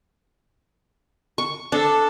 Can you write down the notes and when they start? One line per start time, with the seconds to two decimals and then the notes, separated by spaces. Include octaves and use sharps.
1.38 C#6
1.72 D4 A4